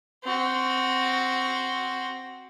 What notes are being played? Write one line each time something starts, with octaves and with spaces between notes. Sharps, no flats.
C4 F#4